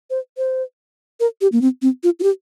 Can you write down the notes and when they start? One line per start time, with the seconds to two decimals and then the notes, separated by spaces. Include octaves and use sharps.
0.10 C5
0.38 C5
1.20 A#4
1.41 G4
1.52 A#3
1.61 C4
1.82 C4
2.03 F4
2.20 F4
2.23 G4